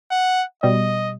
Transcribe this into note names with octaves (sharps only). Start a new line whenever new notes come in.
F#5
B2 G3 D#5